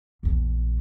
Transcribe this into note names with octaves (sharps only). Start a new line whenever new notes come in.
A#1 E2